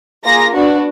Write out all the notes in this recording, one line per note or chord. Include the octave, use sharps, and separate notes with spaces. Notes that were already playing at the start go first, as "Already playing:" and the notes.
A#3 F4 G#4 A#6
B3 D4 F#4